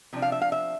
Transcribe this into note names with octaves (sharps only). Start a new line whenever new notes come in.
C3 F3 D4
F5
E5
F5
E5